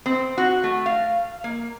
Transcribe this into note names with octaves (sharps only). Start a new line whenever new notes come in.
C4
F#4
A3
F5
A#3